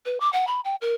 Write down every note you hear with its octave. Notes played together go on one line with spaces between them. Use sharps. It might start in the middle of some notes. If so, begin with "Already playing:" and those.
B4
D6
F#5
B5
G5
A#4